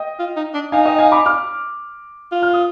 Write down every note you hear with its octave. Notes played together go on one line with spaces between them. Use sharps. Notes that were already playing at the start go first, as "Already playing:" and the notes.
Already playing: D#5 G5
F4
D#4
D4
D#4 F5 G#5
D#5 G5
F5 G#5
B5 D6
D6 F6
F4
F6
D#6